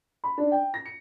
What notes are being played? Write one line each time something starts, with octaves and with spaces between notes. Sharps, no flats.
B5
D4
G5
A#6
C#7